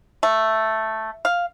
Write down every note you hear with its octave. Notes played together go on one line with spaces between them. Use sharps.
A3
F5